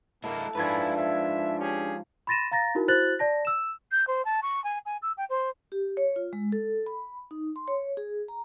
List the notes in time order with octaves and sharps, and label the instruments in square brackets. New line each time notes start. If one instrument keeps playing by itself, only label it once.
[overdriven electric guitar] G#3 E4 [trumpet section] A#3 [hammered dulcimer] A4
[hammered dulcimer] G#2 F3 G#5 [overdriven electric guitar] D4 B4 [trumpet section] E4
[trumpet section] E5
C#4 G4 G#4
[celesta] B5 C6 A6 A#6 D#7 E7
F5 A#5 A6 A#6
D#4 E4 F#4 A#4
E4 F#4 C5 F#6 A6 F#7
D5 A5 A#6
E6 E7
[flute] G6
C5
A5
C#6
G#5
G#5
E6
G5
C5
[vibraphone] G4
C#5
F4
G#3
A4
B5
D#4
C6
C#5
G#4
A#5